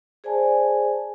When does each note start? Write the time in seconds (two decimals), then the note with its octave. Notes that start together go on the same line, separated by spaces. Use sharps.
0.24 G#4 C5 D5 G#5 A5